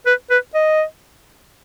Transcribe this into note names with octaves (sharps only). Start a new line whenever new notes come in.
B4
B4
D#5